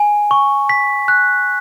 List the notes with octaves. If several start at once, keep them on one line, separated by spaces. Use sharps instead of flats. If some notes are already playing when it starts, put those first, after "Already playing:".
Already playing: G#5
C#6
B6
F#6